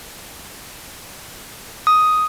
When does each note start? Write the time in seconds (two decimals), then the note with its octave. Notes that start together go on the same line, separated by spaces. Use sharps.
1.87 D#6